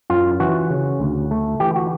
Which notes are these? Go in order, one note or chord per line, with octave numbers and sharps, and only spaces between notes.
F#2 F4
E3 F#4
C#3
D2
A3
E3 G4
F#4